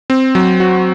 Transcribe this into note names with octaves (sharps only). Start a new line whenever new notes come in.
C4
F#3
F#4